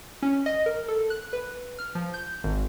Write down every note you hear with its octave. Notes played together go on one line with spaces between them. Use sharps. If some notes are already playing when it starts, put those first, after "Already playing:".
C#4
D#5
A#4
A4
F#6
B4
F6
F3
G6
G#1